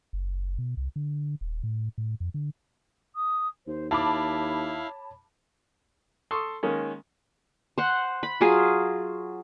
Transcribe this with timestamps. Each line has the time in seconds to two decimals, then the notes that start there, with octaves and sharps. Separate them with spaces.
0.13 F#1
0.58 B2
0.77 C2
0.96 D3
1.41 D#1
1.63 A2
1.98 A2
2.20 F2
2.34 D3
3.15 D#6
3.66 D#2 C5
3.91 D#2 E4 C#5 F5 A5 B5 D6
6.31 A4 C6 C#6 D#6
6.63 D#3 G#3 A#3 C#4
7.78 C5 F#5
8.23 B5
8.41 F#3 F4 G#4